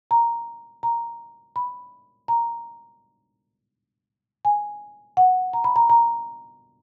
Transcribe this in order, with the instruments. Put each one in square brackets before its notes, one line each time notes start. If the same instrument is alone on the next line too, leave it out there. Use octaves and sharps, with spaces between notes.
[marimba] A#5
A#5
B5
A#5
G#5
F#5
A#5
B5
A#5
A#5